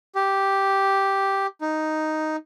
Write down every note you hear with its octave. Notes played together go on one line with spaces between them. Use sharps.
G4
D#4